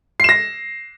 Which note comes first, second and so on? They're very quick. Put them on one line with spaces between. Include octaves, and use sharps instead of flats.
C7 E7 A#6